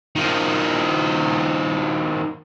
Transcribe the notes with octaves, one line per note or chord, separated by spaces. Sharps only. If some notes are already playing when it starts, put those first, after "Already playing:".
D#3 F3